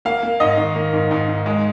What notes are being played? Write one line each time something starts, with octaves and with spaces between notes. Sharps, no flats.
A#3 F5
A#3
G#2 D#5
D#3
A#3
G#2
G#2
G#2
G#3